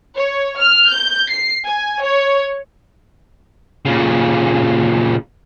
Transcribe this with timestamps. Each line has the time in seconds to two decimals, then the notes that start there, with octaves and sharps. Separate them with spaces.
0.18 C#5
0.60 F6
0.93 G6
1.31 C7
1.65 G#5
2.04 C#5
3.85 A#2 C#3